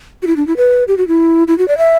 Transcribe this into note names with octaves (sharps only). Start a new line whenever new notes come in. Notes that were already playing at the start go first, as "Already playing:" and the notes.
F#4
E4
D4
E4
B4
G4
F#4
E4
E4
F#4
D5
E5